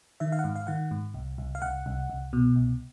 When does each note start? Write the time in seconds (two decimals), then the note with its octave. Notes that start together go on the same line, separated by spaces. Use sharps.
0.20 D#3 E5
0.32 F5
0.39 F#5
0.44 G#2 F5
0.56 F5
0.67 D#3 F#5
0.91 G#2
1.14 C2
1.38 C2
1.55 F5
1.62 C2 F#5
1.86 C2
2.10 C2
2.33 B2
2.56 C2